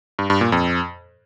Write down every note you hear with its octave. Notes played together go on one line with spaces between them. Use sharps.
G2
G2
A#2
F2